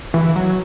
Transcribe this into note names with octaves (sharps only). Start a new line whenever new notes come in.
E3
F#3